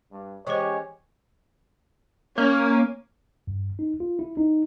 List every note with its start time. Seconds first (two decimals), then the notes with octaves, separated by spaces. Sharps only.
0.10 G2
0.47 E3 G#3 C#4 G4 C5 C#5
2.38 A#3 C#4
3.47 G2
3.79 D#4
4.00 F4
4.19 E4
4.37 D#4